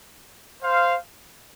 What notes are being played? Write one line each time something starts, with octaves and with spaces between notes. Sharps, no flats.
C5 F5